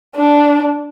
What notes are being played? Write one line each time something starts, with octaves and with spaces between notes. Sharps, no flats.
D4